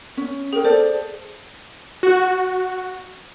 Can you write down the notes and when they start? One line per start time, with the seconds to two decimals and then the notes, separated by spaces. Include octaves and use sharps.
0.17 C#4
0.53 G#4 A#4 G5
0.65 A4 C5 D5
2.03 F#4